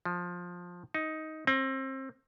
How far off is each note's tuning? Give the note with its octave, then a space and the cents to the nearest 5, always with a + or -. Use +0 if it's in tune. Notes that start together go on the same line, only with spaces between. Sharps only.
F3 +15
D#4 +10
C4 +30